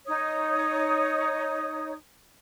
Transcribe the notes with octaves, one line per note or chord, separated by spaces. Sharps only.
D#4 C#5 D#6